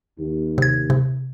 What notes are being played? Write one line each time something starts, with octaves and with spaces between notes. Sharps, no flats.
D#2
C3 G#6
C3